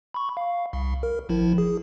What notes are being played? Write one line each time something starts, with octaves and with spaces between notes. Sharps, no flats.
B5 C#6
F5
C2
A#4
G#1 F3 E4
G#4